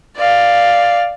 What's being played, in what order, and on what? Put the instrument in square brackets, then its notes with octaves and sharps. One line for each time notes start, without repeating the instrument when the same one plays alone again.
[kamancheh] D5 F5